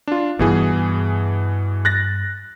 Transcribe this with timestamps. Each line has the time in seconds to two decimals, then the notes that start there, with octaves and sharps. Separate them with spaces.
0.07 D4 F4
0.39 G2 B2 E3 B3 G#4
1.85 F#6 A6 A#6